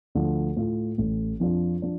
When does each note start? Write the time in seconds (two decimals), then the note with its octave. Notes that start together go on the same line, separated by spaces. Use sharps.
0.15 D2 D3 F3
0.57 A2 A3 F4
0.98 A1 A2 A3
1.40 F2 F3 D4 F4
1.82 F3 D4